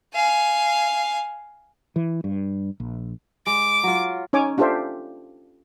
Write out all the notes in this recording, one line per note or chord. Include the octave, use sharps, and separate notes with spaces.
F5 G#5
E3
G2
A#1
G#3 D6
F#3 F4
C#4 D#4 C#5 G#5 D6
D4 F4 G4 A4 C5 E5